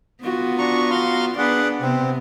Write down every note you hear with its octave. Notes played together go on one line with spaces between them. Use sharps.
B3 F4 F#4
D4 A#5 C#6
F5 A#5 C6
B3 D4 G#4 B4 D5 F#5
C3 B3 C4